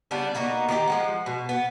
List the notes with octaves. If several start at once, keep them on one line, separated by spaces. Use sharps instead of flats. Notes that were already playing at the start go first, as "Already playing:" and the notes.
C#3 G3 B3 D4
A#3 B3 D#4 F#4
D#3 D#4 F4 G4
F3 G#3 F#5
B2
B3